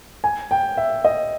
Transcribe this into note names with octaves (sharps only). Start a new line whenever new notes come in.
G#5
G5
E5
D#5